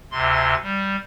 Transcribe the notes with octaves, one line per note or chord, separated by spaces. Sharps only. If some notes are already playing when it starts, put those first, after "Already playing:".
D2 C3 C6
G3